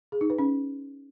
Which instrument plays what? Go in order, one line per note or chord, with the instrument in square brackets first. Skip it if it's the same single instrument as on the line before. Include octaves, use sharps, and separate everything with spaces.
[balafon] G#4
D#4
B4
C#4